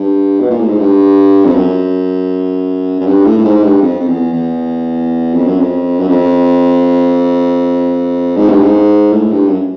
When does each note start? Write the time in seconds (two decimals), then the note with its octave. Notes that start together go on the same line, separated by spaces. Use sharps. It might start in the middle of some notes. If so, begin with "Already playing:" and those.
Already playing: G2
0.40 B2
0.50 A#2
0.60 A2
0.69 G#2
0.79 G2
1.45 F2
1.55 F#2
3.00 F#2
3.07 G2
3.25 A2
3.38 A2
3.45 G#2
3.63 G2
3.82 F2
4.00 F2
4.08 E2
4.33 E2
5.34 F2
5.47 F#2
5.60 F2
5.99 F#2
6.09 F2
8.37 G#2
8.49 G2
8.63 G#2
9.12 A2
9.31 G2
9.48 F#2